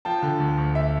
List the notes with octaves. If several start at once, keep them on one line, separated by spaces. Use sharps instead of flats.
F3 G5 A5
D3
D2
D2
E5